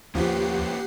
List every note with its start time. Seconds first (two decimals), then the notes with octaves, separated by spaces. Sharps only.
0.15 D#2 F3 A#3 C#4 G4 B4 F#5 C7